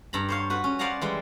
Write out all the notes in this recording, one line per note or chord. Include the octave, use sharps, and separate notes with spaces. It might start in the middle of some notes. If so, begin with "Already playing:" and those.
G2 A#5 B5
C5 C#5 F5
F#4 B4
C#4
C5 D5 F5 F#5 G#5 A#5
E3 G3 G#3